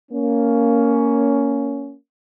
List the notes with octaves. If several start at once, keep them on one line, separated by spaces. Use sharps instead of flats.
A#3 C#4